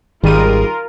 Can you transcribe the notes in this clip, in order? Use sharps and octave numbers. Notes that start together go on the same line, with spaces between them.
G#1 D#3 G3 F4 G#4 A#4 D#7